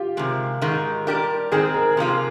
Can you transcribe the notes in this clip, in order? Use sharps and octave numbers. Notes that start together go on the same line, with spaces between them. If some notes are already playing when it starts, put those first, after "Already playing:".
Already playing: F4 G4
C3 D#3 G#3
G#2 D#3 G#3 D#4
A#2 G3 D4 G4 A#4
D#3 G#3 C4 D#4 G#4
A#4
C3 F3 A#3 F4